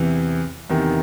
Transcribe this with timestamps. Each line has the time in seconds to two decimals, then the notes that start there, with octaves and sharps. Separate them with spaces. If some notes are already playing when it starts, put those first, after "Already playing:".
Already playing: E2 C3 E3
0.70 E2 C3 D#3